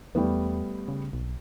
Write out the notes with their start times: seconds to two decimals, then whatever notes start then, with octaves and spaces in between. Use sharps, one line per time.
0.15 E2 G3 A3 B3
0.88 C#3
1.13 B1